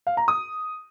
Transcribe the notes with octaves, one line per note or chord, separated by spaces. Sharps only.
F5
A#5
D#6